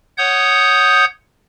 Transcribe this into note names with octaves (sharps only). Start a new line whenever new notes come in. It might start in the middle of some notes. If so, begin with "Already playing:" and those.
C#5 F#5 D#6 G6